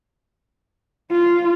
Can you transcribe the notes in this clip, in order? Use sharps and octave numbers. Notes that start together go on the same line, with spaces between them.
F4